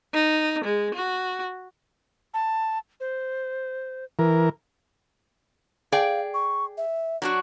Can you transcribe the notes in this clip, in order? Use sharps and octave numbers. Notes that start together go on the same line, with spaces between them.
D#4
G#3
F#4
A5
C5
E3 A#4
G#4 D5 F5 G5
C#6
E5
F#3 D4 F#4